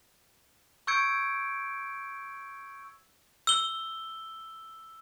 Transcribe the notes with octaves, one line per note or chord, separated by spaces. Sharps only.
C#6 E6 G6 G#6 C#7 D7
E6 G7